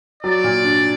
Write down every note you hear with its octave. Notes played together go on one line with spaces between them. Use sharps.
F#3 D5
A#2
D4